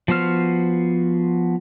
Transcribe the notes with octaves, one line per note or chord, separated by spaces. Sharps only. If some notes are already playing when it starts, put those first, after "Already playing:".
F3 B3 F#4 C5 F6